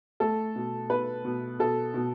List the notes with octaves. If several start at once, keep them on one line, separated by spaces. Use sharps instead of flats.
A3 A4
B2
B2 B4
B2
B2 A4
B2